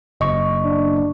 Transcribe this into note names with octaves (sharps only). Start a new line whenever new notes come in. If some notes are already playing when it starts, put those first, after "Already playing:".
F#1 D#5 C#6
D4